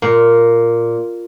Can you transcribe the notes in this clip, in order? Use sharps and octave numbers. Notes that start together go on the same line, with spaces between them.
A#2